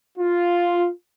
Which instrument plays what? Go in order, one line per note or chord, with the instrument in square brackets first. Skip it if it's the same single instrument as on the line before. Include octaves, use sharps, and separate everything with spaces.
[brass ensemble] F4